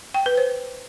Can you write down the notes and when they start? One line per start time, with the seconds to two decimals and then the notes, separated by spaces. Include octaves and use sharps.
0.14 G5
0.26 B4
0.38 C5